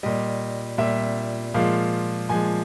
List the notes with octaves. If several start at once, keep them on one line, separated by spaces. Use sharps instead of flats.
A#2 G3 D#5
A#2 G3 E5
A#2 F3 G#3 F5
A#2 F3 G#3 G#5